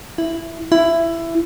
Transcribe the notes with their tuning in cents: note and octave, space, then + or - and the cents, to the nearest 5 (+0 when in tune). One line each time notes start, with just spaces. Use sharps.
E4 +5
E4 +15